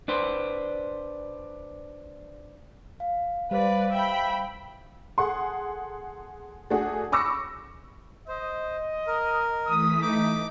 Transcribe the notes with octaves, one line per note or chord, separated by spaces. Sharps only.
D4 B4 C5
F5
G3 B4 C5 D5 F5
E5 G5 B5
G#4 A4 F#5 C6
A3 D4 F#4 G#4 F#5
B5 C#6 D6 E6 A#6 C#7
C5 D#5
A#4
E3 A3 D#6 B6
D#4 D#5 D6